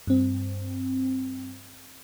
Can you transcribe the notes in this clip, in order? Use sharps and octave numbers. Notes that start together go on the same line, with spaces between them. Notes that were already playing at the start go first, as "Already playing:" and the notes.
G2 C4